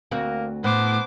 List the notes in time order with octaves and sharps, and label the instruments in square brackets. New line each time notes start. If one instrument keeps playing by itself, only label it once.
[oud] D2 C4 F#4 [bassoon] A#3
[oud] A2 [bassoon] B3 [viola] C5 D6